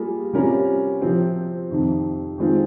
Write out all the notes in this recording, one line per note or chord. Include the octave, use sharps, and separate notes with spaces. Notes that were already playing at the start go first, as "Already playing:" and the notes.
Already playing: G3 A#3 F4 G#4
C3 G3 C#4 F4 A#4
C3 F3 C4
F2 C3 D#3
D#3 G#3 C4 F4